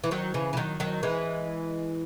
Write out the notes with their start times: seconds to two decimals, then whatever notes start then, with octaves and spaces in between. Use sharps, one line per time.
0.04 E3
0.11 D#3 F#3
0.34 C#3 E3
0.53 E3
0.57 D#3 F#3
0.80 D#3 F#3
1.03 E3 G#3